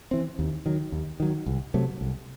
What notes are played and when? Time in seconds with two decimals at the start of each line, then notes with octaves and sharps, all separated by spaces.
0.11 E3 C4
0.39 D#2
0.66 D#3 F#3
0.92 D#2
1.20 D#3 F#3
1.46 C2
1.74 C3 F#3 A3
2.01 C2